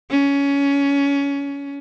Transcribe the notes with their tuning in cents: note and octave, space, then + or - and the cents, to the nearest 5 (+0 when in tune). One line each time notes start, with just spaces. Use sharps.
C#4 +20